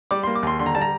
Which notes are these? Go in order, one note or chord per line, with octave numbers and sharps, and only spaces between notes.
G3 D6
C6
A#3
D6
D#2 C6
D3 C6
A#5
G3 A5
A#5